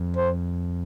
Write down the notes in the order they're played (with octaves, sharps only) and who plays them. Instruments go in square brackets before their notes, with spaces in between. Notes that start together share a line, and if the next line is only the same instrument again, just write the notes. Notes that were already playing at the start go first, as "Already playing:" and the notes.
Already playing: [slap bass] F2
[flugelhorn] C5